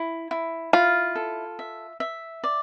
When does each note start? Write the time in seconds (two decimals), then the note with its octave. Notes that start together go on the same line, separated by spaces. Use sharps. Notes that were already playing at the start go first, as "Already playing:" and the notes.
Already playing: E4
0.31 E4
0.73 E4 F4
1.15 A4
1.59 E5
2.00 E5
2.44 D5